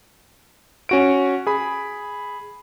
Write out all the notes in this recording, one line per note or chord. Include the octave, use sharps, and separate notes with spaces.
C#4 F#4 D7
G#4 B5